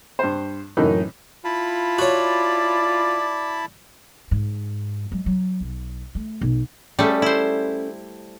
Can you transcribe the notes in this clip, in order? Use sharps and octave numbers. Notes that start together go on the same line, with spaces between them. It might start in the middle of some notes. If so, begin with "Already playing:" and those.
G2 C5
F#2 A2 E3 D#4
E4 F4 A5 B5
F#4 C#5 D5
G#2
F#3 G#3
F#3
B1
A3
B1
G3 A3 C#4 G#4 A4
E4 C5